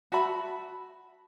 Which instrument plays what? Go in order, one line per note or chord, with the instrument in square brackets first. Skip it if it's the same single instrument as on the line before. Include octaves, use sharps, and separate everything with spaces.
[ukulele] F#4 E5 A5 B5